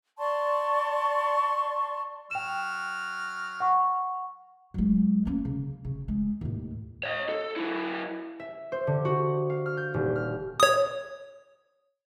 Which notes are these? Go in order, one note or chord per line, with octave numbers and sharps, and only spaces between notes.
D5 A5 C6 C#6
F#3 G5 F6 E7
F#5 C#6
F#3 G#3
A#3 C#4
C#3
C#3
G#3
D#2 A2
C#5 D#5
A4
F#3 E4
E5
C5
D3
F#4
F5
F6
G6
D#1
F6
C#5 D#6